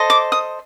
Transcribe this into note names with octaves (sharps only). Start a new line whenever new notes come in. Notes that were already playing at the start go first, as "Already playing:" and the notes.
Already playing: A4 C5 D#5
D6
D#6